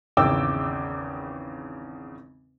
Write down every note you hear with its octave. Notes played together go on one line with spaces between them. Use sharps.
G#1 E2 C#3 G5 D6 E6